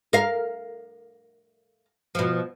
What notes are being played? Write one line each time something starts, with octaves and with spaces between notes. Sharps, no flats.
A#4 F5
B2 F3